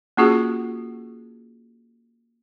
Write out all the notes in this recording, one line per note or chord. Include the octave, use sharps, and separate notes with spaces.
A#3 C#4 F4 F#4 G#4